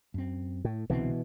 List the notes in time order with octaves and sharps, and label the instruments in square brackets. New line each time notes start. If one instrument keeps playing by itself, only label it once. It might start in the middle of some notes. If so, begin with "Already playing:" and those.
[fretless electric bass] F#2 C4
[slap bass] A2
[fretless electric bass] C2 D3 C4 [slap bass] B2 E3